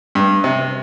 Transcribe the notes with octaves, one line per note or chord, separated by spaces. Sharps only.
G2
C3